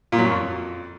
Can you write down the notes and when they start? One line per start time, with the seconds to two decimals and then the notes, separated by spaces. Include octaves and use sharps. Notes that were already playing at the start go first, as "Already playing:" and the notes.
0.12 A#2
0.19 F#3
0.25 F#2
0.31 F2